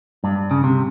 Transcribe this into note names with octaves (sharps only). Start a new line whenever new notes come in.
G2
C#3
C3